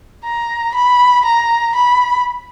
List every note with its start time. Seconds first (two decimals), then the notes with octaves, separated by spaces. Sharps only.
0.24 A#5
0.75 B5
1.25 A#5
1.75 B5